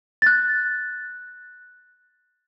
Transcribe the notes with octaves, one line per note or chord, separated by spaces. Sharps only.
F#6 A6